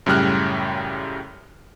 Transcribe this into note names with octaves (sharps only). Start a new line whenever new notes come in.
F#2 A2 C#3 G3 F6 F#6